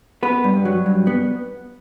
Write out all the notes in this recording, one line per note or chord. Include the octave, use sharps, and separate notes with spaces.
B3 B4
G2
F#3
G2
B3